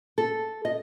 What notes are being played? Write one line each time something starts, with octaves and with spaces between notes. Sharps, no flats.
A4
D#5